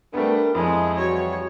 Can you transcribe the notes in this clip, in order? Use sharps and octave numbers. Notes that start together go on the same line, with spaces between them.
G3 A3 B3 D4 A#4
F2 G#3 E4
E3 G3 F#4 C#5